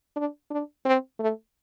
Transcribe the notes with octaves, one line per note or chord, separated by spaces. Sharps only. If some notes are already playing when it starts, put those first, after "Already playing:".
D4
D4
C4
A3